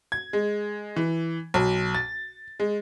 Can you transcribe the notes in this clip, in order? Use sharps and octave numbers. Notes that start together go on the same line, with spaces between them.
G#6
G#3
E3
B1
A6
G#3